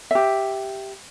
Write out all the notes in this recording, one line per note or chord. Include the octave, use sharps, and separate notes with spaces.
G4 E5